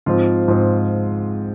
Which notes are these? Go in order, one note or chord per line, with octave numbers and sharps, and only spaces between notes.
G#2 F3 C4 F4
G#2 F3 C4